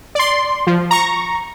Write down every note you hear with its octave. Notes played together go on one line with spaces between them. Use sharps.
D5 C6
F3
A#5 C#6